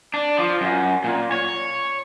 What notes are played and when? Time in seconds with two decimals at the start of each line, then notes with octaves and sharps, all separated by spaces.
0.14 D4
0.39 F3
0.61 F#2
1.04 A#2
1.32 C#5